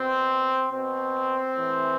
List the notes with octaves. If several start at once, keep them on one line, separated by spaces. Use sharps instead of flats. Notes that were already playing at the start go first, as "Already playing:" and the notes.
Already playing: B2 C4
B2 C4
A2 E3